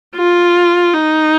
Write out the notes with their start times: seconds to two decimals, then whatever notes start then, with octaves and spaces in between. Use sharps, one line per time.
0.16 F4
0.93 D#4